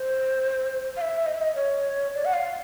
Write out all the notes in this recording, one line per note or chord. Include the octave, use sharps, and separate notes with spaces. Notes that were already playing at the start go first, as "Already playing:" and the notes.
Already playing: C5
F5
E5
D#5
E5
D#5
C#5
D5
F#5
F5